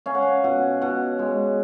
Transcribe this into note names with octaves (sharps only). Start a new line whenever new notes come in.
C#4 F5
F#5
F5
B2 F#5
B2 F#5
G#3